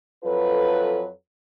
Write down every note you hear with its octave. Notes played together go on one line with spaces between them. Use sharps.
F2 F#3 F4 A4 B4